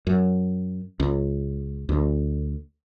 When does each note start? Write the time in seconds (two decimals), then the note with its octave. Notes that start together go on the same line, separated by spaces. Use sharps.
0.07 F#2
1.00 C#2
1.89 D2